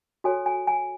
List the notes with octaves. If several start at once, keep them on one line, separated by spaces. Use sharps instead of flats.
F#4 A4 C#5 G#5
G#5
G#5